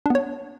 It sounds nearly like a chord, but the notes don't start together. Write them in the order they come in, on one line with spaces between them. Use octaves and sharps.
D4 B3 C#5